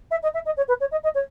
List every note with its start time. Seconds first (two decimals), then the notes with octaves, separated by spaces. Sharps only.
0.11 E5
0.23 D#5
0.34 E5
0.46 D#5
0.57 C#5
0.68 B4
0.80 C#5
0.91 D#5
1.03 D#5
1.15 C#5